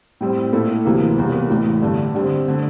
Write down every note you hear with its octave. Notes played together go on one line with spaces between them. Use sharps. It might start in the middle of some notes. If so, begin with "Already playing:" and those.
A2 G3 C4
A#2 A3 E4 A4
D2 C3 E3 A#3
E1 E2 C3 G3 A#3
A1 A2 E3
G2 D3 A3 D4
D3 G3 C4
D3 A3